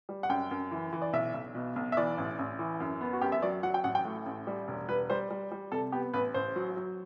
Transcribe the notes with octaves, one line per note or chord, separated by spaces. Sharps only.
G3
F#5
F#2 G5
F#2
E3
E3
D5
B1 E5
B1
B2
B1
E5
E3 D5
A1
A1
E3
F#2
B3
F#4
F#2 G4
E5
F#3 D5
F#3 F#5
G5
A1 F#5
G5
A2
A1
G3
E1
G3 B4
G3 C5
G3
G3
C3 A4
B3 G4
A1 B4
A1 C5
F#3
F#3